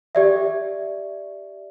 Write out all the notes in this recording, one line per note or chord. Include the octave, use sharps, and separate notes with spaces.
G4 D5 E5